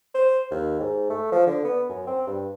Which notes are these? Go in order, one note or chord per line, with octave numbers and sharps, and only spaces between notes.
C5
D#2
G#2
A3
F3
D3
B3
F#2
C4
G2